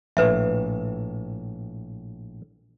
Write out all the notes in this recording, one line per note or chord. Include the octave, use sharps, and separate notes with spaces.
A#1 A2 B4 E5